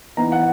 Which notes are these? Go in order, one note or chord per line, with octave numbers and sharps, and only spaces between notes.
E3 B3 D#4 A#5
F#5